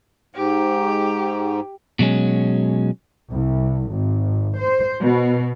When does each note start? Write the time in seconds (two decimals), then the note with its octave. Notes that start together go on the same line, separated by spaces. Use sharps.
0.35 G#2 G4
1.99 B2 F#3 G#3 C#4
3.31 C2
3.90 G#1
4.58 C5
5.01 B2